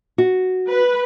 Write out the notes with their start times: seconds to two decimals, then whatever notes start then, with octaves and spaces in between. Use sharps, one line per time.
0.18 F#4
0.68 B4